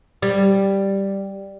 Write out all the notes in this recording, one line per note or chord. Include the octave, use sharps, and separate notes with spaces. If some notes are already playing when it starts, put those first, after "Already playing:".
G3